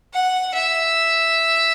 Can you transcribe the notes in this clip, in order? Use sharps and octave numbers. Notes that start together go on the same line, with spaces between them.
F#5
E5